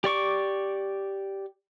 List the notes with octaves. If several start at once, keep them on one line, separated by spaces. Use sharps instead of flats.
G4 D5 C#6 D6